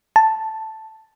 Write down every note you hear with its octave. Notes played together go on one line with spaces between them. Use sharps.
A5